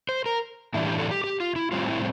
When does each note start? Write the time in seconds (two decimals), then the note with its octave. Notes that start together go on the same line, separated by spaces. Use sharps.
0.09 C5
0.26 A#4
0.74 A2 E3 G3 D4 E4
0.87 G4
0.98 A4
1.11 G4
1.24 G4
1.40 F4
1.56 E4
1.72 A2 G3 C4 F4
1.88 E4